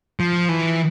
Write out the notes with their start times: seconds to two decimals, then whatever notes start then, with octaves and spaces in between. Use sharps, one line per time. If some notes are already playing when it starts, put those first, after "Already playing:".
0.20 F3
0.49 E3